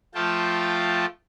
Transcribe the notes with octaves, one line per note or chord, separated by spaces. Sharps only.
F3 A3 F4 G5 A5